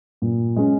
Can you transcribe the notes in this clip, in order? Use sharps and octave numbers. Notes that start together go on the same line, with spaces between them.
A#2
G#3 C#4